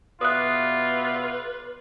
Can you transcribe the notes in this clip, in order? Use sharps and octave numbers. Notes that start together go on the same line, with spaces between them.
B2 F4 B4 D5 E5 D#6 F#6